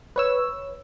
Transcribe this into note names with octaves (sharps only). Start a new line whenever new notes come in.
B4 C#5 E6